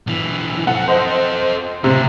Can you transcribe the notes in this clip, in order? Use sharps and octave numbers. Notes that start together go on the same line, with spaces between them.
B1 E3
C4 A4 F#5
C5 D#5
C#2 A2 C3